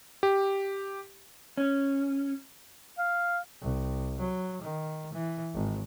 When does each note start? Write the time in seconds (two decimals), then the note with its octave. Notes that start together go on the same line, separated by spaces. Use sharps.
0.23 G4
1.57 C#4
2.98 F5
3.62 C2
4.20 F#3
4.62 D#3
5.13 E3
5.54 G#1